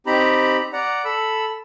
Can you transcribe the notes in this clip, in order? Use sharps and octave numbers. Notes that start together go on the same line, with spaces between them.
C4 D#4 G4 A#5 B5
D5 F#5 A#5
A4 B5 E6